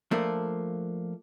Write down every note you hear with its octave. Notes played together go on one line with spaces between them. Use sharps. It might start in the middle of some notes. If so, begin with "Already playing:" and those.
F3 A3 A#3 D4